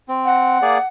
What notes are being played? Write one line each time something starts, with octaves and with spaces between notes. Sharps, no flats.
C4
F#5
A#3 G#4 D5